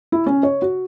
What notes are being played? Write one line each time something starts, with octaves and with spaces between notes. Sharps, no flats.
E4
C#4
C#5
F#4